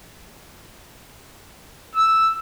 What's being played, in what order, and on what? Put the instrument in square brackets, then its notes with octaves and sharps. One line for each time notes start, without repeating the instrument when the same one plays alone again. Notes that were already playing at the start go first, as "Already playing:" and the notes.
[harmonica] E6